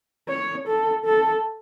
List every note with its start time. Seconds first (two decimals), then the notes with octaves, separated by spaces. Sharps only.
0.29 C#5
0.67 A4
1.05 A4